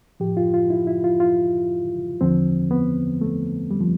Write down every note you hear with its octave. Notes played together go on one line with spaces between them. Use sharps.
A2 F3 G4
F4
F4
E4
E4
F4
F4
E2 D3 F3 C4
B3
A3
G3
F3